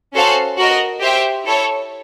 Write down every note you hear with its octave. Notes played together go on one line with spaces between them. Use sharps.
C#4 F#4 A4 C5 F5
F#4 A#4 D#5
G4 C5 E5 G5
E4 A4 C#5